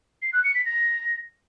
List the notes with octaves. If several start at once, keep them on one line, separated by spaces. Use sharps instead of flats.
C7
F#6
C#7
B6
A#6